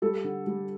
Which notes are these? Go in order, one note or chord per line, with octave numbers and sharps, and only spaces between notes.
G3 G4 A4
D3
G3